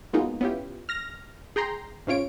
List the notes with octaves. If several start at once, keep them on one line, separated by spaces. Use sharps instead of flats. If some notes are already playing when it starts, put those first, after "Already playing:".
F#3 G#3 A#3 B3 D#4 F4
B3 C#4 E4 F4 G4
F6 A#6
G#4 G5 A#5 C6
G#2 C3 C#4 F4 C#5 D7